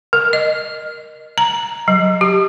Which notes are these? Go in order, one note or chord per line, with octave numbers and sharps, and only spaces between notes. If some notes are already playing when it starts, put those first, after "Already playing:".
A#4
D#5
A#5
F#3
G4